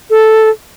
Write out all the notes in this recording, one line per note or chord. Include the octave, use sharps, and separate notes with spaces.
A4